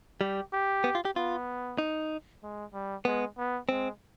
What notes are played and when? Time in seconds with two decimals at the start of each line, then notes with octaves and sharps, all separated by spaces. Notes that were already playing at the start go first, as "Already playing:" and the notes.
0.21 G3 G4
0.53 G4
0.84 B3
0.95 F4
1.05 G4
1.16 B3 F4
1.78 D#4
2.43 G#3
2.74 G3
3.05 G#3 B3
3.38 B3
3.69 G#3 C4